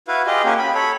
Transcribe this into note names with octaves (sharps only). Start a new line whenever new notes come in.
E4 F#4 B4 F5
F4 G4 G#4 D#5
A#3 C#4 F#4 G4
B5
A4 C#5 B5